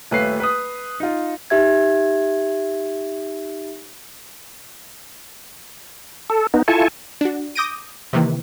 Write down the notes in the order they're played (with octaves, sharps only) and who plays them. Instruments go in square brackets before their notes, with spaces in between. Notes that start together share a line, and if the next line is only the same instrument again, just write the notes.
[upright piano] D#1 A3 B4 C#5 F5 C7
B4 D#6
D#4 F4
[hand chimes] D#4 G4 E5 G#6
[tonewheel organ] A4
B3 D#4
E4 F4 A4 G#5 A5 C#6
[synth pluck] D4 F#4
D6 D#6 G6 A#6 D7 D#7
C3 D#3 E3 A#3